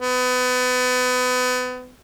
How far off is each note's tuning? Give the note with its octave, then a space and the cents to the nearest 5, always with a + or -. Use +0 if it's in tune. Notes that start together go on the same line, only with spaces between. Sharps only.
B3 +30